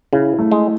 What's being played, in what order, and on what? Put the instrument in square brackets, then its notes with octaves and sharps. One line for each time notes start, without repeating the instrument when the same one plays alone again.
[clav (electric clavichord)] C#3 [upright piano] E4
[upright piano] A3
[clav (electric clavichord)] G#3